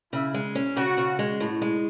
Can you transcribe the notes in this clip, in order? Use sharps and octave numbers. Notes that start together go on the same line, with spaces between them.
C#3 E4
G#3
C#4
C#3 F#4
C#3
G#3
A2
G#3